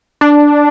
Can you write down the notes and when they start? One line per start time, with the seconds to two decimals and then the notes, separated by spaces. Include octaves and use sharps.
0.21 D4